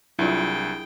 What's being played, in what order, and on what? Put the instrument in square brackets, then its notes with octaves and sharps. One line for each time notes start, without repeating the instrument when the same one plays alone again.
[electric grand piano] C2 [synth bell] F#3 D4 F4 [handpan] E4 [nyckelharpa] G#4 G5